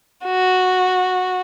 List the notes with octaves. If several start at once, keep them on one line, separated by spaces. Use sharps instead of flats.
F#4